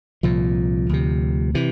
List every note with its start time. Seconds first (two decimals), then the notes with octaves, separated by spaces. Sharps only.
0.23 C2 A#2 F3
0.89 D2 C3
1.55 C3 E3